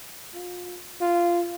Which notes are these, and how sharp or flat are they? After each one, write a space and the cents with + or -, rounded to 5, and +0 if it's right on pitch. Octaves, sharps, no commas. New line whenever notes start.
F4 +35
F4 -15